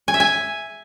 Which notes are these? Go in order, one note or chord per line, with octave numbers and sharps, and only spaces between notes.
G#5
E5
G#5